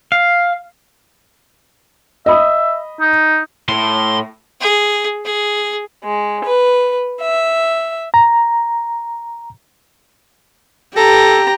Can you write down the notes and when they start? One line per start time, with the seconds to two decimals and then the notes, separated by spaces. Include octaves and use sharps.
0.12 F5
2.26 D#5 E5 B5 D#6
3.00 D#4
3.69 A2 C6
4.61 G#4
5.25 G#4
6.04 G#3
6.46 B4
7.23 E5
8.14 A#5
10.97 G4 A4 A#5